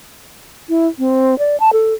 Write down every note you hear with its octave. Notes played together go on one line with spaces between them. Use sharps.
E4
C4
D5
A5
A4